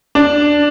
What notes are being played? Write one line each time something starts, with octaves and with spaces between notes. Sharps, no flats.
D4